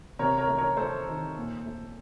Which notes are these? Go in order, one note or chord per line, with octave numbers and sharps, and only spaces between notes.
C3 A#4 C#5
A#4 C#5
A3
A#4 C#5
A3 A4 C5
D#3
A#2
A3